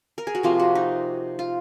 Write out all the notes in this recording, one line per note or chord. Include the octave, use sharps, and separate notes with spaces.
A#4
G#4
F#4
C3 F3 A#3 F4
F#4
D#4
F4